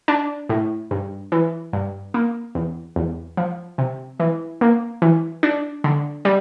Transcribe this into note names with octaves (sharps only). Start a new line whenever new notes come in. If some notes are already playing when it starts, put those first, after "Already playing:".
D4
A2
G2
E3
G2
A#3
E2
E2
F3
C3
E3
A#3
E3
D4
D3
G3